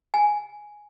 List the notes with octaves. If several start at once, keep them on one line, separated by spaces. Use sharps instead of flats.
G#5